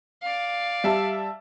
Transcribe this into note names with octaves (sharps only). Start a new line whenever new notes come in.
D5 F5
G3 E5 A5